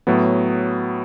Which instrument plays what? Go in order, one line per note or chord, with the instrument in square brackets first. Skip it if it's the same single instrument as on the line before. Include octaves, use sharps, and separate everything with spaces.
[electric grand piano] A2 F#3 B3